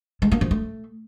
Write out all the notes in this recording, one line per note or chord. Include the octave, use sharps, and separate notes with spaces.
G#3
A#3
F3
A3